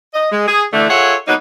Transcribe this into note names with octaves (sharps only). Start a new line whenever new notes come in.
D#5
G#3
G#4
D3 E3 A3
F4 G#4 A4 C#5 E5 F#5
F#3 A#3 B3 D#4